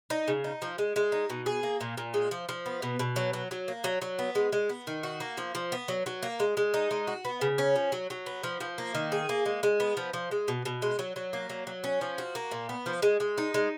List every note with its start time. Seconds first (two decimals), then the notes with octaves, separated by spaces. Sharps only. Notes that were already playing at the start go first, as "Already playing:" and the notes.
0.10 D#4
0.28 C#3
0.44 D#4
0.62 F3
0.78 G#3
0.96 G#3
1.12 D#4
1.30 B2
1.46 G#4
1.63 A#3
1.81 A#2
1.97 A#2
2.14 G#3
2.31 F3
2.49 F3
2.66 B3
2.82 B2
2.99 B2
3.16 F#3
3.33 F#3
3.51 F#3
3.68 A#3
3.84 F#3
4.02 F#3
4.19 B3
4.35 G#3
4.52 G#3
4.70 B3
4.87 D#3
5.03 F#4
5.20 A#3
5.37 F3
5.55 F3
5.72 B3
5.88 F#3
6.06 F#3
6.23 A#3
6.40 G#3
6.57 G#3
6.74 D#4
6.91 G#3
7.07 F#4
7.25 B3
7.41 C#3
7.58 C#4
7.76 F3
7.92 F#3
8.10 F#3
8.26 B3
8.44 F3
8.61 F3
8.78 A#3
8.95 D#3
9.12 G#4
9.29 A#3
9.46 G#3
9.63 G#3
9.80 B3
9.97 F3
10.13 F3
10.31 G#3
10.48 B2
10.65 B2
10.82 G#3
10.99 F#3
11.16 F#3
11.33 A#3
11.49 F#3
11.67 F#3
11.84 C#4
12.01 F3
12.18 F#4
12.35 A#3
12.51 A#2
12.69 B3
12.86 F3
13.02 G#3
13.20 G#3
13.38 D#4
13.54 G#3